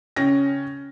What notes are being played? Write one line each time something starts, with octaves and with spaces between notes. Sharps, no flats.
C#3 C#4 G5 A#6